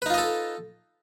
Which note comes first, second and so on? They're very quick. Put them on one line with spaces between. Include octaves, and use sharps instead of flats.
B4 D#4 F4 D#5 A4